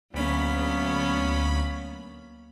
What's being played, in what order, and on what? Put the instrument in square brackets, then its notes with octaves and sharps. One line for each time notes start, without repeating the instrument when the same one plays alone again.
[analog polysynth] D2 B5 [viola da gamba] F#3 B3 C#4 [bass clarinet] A#3